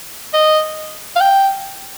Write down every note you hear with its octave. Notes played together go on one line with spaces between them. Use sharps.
D#5
F5
G5